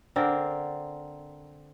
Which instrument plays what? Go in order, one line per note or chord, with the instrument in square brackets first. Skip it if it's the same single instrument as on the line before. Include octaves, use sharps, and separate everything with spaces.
[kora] D3 C4 A#4 D5